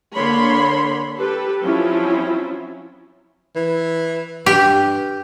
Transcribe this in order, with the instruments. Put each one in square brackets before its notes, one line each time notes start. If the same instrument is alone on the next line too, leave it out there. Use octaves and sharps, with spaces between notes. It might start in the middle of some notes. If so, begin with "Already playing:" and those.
[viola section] D3 A#3 C#5 B5 C6
G4 A4 B4
F3 F#3 C4 C#4 E4 F4
[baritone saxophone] E3
[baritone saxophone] G2 [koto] G4